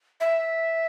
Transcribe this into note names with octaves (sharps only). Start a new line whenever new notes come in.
E5